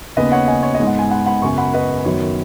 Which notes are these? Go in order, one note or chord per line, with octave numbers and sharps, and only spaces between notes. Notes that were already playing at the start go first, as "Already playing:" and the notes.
D#2 C#3 B3 B4 D#5
C#5 F#5
D#5 G#5
C#5
D#5
G#2 G#3 B3
F#5
G#5
F#5 B5
F#5 B5
F#2 C#3 B3 G#5 C#6
F#5 B5
B4 D#5
F#2 D#3 F#3 B3 C#5